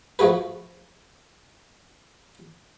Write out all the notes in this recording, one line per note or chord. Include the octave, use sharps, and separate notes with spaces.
F3 A3 F#4 G#4 B4